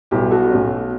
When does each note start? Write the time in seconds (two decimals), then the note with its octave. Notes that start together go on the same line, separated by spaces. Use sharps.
0.11 B1 B2 G3 B3 E4 G4
0.31 F#4 A4
0.50 B1 B2 A3 C#4